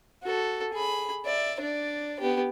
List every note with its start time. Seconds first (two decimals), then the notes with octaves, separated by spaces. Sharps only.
0.23 F#4 A4
0.73 G#4 B5
1.26 D5 E5
1.60 D4 D5
2.20 B3 G4